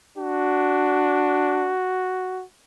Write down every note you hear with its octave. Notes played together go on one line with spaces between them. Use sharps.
D4 F#4